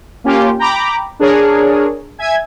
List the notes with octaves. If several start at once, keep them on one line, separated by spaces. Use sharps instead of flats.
A#3 C#4 F4 G4
G5 A#5 B5 D6
D4 G#4 A#4 C#5
E5 G#5 G#6